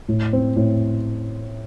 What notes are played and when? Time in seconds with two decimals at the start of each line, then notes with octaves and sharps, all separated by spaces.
0.08 A2
0.33 C4
0.56 A2